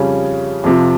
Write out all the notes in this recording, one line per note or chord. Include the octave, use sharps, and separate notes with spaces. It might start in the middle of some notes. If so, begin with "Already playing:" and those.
Already playing: F2 C#3 G3 C#4
F2 C3 F3